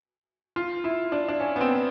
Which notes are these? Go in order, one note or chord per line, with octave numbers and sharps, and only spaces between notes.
F4
E4
D4
D4
C#4
B3
C4